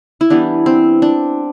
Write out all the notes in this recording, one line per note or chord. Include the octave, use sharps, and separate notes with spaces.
E4
E3 G3 B3 D4
C4
D4